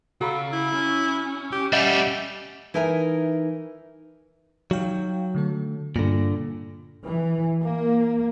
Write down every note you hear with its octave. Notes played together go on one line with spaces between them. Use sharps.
C#3 F#4 A4 F5 A#5 B5
E4
C#4
G4
G3 A3 G4 D#5 E5 F#5
E3 D#4 A#4 E5 G#5
F#3 D#4 F5 G5
D3 A3 A4
G2 A#2 D3 D5 A#6
E3
A#3